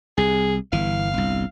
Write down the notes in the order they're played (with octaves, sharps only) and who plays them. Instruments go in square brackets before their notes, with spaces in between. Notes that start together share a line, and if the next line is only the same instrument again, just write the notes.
[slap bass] C2 [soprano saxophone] G#4
[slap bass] G1 E3 [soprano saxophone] F5
[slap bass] G1 C2